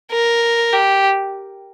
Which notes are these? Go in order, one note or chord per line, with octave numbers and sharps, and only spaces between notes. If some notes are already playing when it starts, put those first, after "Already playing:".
A#4
G4